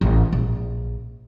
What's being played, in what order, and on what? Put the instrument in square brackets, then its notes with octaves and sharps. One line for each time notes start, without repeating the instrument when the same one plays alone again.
[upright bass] A1
A#1